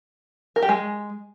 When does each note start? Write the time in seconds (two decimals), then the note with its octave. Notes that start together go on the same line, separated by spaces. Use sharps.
0.56 A#4
0.62 G4
0.69 G#3